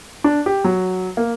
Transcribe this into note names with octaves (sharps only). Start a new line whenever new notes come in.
D4
G4
F#3
A#3